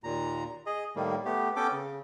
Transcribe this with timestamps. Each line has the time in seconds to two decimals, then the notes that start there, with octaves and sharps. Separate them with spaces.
0.04 D#2 A#2 A#5
0.66 G#4 D#5
0.96 A2 D#3 G3 A#3
1.25 A3 B3 G4
1.56 B3 C#4 A4 G5 D6
1.72 C#3